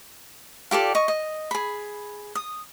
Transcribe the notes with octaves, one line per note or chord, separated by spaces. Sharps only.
F4 G4 A4 D5
D#5 C#6
D#5
G#4 B5
D#6